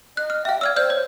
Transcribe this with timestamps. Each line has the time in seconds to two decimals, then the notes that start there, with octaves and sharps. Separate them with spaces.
0.17 D#5 F#6
0.30 F6
0.45 E5 F5 G5
0.61 D5 E6 F6 G#6
0.76 C5 D5 F6 G6
0.90 C#5